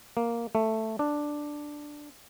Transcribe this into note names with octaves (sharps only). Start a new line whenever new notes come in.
A#3
A3
D4